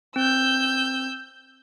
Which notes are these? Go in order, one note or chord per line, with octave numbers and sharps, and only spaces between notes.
C4 E6 G6